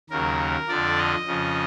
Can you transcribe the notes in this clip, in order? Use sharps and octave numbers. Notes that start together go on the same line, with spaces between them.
D#2 C#3 F#3 A#4
F2 D3 F3 D5
D#5
F2 C#3 F3